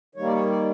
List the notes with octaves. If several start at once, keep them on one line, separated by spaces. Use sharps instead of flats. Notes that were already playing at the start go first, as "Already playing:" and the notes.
D#3 G3 A#3 C#5
D5
C#5
D5